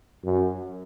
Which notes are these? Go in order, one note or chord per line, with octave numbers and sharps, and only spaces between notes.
F#2